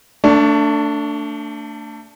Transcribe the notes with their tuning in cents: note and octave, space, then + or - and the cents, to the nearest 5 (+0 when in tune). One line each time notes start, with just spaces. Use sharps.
A3 +25 D4 -10